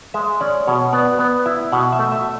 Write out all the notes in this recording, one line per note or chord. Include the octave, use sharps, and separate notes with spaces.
G#3 E5
C#4 D5
B2 C#5
B3 D5
B3
E4
B2 F#5
E5
A3
E5